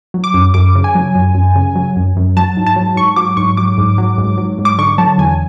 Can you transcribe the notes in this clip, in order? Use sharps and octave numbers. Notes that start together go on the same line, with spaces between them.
F#3
D6
F#2
F#2 D6
C#3
G#5
F#3
F#2
F#2
C#3
F#3
F#2
F#2
F#3 A5
G#2
A5
F#3
G#2 C#6
F#3 D6
G#2 C#6
F#3 D6
G#2
F#3
G#2
F#3
G#2
D6
D3 C#6
F#3 A5
E2 G#5